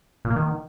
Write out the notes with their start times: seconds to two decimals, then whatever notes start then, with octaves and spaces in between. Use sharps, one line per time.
0.25 A#2
0.30 A#3
0.36 D#3